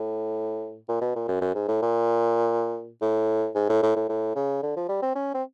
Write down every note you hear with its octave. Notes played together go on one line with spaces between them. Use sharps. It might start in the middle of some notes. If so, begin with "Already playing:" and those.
Already playing: A2
A#2
B2
A#2
F#2
F#2
G#2
A2
A#2
A2
G#2
A2
A2
A2
A2
C#3
D3
F3
G3
C4
C#4
C4